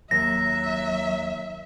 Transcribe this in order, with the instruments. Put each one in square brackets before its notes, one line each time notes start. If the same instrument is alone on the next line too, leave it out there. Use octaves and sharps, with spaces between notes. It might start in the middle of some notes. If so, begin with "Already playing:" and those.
[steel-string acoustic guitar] D#2 [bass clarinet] F#3 [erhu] E5 [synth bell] A#6